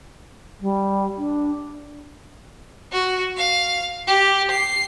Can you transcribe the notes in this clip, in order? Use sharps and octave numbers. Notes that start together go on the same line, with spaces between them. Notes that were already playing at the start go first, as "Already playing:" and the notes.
G3
D4
F#4
F5
G4
C7